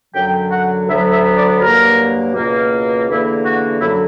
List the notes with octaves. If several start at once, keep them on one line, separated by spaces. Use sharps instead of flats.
F#2 D3 F#3 G5
F#5
D2 D3 F#3 B3 E5
E5
D5
G2 F#3 A#3 A#4
C#2 B2 A#3
E2 D3 A#3 E4
F#4
F#2 D3 F#3 E4